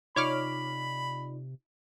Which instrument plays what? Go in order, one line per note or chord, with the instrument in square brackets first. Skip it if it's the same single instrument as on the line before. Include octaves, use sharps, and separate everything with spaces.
[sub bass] C3 [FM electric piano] D#4 F4 D5 [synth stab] C#5 D6 F6 [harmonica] B5